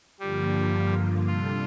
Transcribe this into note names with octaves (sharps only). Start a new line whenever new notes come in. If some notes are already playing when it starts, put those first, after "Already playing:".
G2 D3 F3 G3 A#3 F4
C3 G3 D4 F4 A4